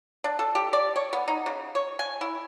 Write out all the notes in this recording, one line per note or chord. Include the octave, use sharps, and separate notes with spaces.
D4
A4
G4
D5
C#5
B3
D#4
C#3
C#5
G#5
E4